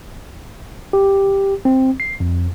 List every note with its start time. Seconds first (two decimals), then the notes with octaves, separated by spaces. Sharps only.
0.93 G4
1.65 C4
2.00 C7
2.20 F2